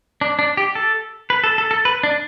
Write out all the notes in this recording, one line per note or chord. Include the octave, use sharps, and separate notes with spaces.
D4
D4
G4
A4
B4
A4
A4
A4
B4
D4